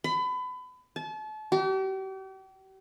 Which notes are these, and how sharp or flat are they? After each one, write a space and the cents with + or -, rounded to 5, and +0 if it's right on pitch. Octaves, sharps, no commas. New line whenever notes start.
B5 +30
A5 -35
G4 -40